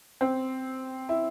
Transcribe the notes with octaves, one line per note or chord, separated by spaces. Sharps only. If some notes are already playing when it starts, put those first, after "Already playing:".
C4
E4